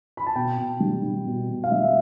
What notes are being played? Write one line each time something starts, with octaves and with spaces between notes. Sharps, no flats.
B5
A5
B2 G5
B2
G3
G3
B2
B2
F5
G3 E5
E5